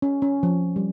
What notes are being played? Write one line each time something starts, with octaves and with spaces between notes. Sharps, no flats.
C#4
C#4
F3
G3